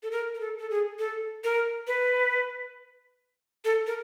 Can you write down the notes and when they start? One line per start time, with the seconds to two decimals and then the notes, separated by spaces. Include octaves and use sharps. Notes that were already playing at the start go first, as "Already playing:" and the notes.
0.03 A4
0.11 A#4
0.35 A#4
0.40 A4
0.58 A4
0.70 G#4
0.99 A4
1.44 A#4
1.87 B4
3.65 A4
3.87 A#4